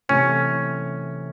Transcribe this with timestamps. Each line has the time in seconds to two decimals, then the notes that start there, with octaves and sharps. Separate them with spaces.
0.09 C3 E3 A3 C#4